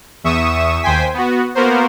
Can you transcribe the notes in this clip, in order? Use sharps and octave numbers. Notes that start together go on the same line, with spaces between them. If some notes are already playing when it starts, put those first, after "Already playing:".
E2 E5 C#6 D#6 E7
D#2 C5 G5 G#5 B6
B3 F#4
A#3 B3 F#4 A#4 C5